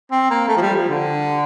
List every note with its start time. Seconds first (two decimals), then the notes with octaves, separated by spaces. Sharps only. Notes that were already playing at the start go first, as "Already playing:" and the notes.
0.11 C4
0.30 A#3
0.48 A3
0.57 F3
0.61 G3
0.76 F3
0.89 D3